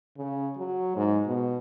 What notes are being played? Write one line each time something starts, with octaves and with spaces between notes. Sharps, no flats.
C#3
F#3
G#2
B2